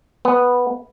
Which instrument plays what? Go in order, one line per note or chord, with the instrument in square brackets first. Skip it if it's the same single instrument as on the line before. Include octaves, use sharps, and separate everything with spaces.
[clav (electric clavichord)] B3